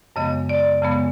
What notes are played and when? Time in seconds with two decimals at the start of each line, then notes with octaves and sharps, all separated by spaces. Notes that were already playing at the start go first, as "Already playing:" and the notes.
0.16 F#2 C#3 F3 G#3 B3 D#5
0.49 D5
0.82 F#2 C#3 F3 G#3 B3